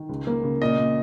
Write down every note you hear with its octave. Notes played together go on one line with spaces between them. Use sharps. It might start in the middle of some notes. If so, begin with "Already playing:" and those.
Already playing: D#3
C#2
A#3
C#3
A#2 D#5
A#2